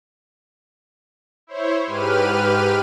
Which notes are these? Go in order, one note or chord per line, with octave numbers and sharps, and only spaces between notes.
E4 C5 C#5
G#2 G4 B4 F6 D#7